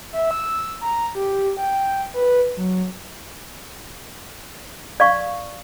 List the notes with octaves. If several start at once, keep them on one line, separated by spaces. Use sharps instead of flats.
E5
E6
A#5
G4
G5
B4
F#3
D5 F5 C#6